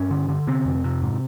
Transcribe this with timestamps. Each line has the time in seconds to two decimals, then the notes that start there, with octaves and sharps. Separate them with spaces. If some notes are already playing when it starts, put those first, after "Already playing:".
Already playing: G2 C#4
0.11 D3
0.29 D3
0.47 C3 C4
0.65 F2
0.84 C3
1.02 G#2